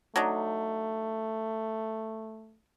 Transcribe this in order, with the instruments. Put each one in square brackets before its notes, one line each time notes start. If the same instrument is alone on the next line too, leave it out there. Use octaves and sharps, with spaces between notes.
[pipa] F#3 D4 D#4 [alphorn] A3